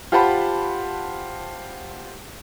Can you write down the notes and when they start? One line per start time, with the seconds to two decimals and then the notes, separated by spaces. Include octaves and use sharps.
0.12 F4 G4 C5 F#5 A5 B5